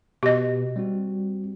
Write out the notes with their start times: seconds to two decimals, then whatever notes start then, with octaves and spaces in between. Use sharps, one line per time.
0.23 B2 G4 D#5
0.76 G3 C4 F#4